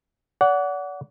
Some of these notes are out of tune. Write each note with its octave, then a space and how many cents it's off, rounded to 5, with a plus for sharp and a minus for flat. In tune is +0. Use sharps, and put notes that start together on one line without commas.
D5 -40 F#5 +0